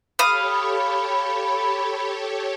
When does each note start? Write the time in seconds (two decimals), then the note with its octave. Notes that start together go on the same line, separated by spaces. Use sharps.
0.19 G4 A4 C#5 F5 B5 D#6